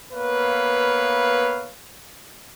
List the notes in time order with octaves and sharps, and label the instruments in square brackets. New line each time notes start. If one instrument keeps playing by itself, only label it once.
[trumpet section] A#3 B3 B4 C#5 F5